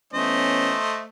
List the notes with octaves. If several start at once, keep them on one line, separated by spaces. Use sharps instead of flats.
E3 A3 B3 C#4 C5 D#5